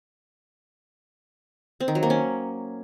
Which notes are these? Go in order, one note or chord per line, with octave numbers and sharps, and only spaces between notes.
C4
D#3
F#3
A#3
C#4